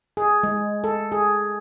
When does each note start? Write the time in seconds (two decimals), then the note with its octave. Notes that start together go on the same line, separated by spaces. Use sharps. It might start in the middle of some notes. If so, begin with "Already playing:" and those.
0.17 G#4
0.43 G#3
0.84 A4
1.12 G#4